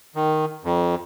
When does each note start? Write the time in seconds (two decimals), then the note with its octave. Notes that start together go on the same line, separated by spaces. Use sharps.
0.15 D#3
0.64 F2